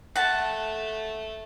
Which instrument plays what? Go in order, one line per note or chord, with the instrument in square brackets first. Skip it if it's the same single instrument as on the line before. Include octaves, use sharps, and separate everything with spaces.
[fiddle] A3 A4 [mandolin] F#5 A5